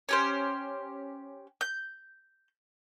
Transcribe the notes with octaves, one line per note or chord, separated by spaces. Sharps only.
C#4 G4 C5
G6